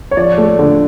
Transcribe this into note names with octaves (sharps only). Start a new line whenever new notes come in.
C#5
F3 D5
A3
D3